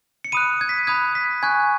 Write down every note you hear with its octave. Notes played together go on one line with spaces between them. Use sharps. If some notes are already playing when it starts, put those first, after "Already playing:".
C#7
B5 D#6 F#6 D#7
G#6
B6
B5 D#6 F#6 G#6
B6
G#5 C#6 F#6 G#6